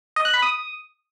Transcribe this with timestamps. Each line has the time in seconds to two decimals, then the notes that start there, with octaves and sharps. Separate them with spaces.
0.16 D#5
0.25 F#6
0.34 B5
0.42 D#6